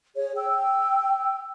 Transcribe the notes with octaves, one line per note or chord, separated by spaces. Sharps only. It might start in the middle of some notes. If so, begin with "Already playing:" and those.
G#4 C#5
G5 E6